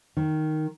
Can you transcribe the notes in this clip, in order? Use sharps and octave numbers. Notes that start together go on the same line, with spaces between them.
D#3